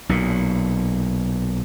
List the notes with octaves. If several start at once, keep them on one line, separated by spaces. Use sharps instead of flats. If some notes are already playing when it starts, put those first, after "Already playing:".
B1 A#2